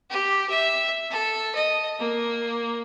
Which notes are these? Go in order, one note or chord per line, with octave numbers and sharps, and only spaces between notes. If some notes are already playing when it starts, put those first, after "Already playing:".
G4
E5
A4
D#5
A#3